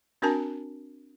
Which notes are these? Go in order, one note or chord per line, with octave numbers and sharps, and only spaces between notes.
C4 D4 F#4 A#4 G#5 A5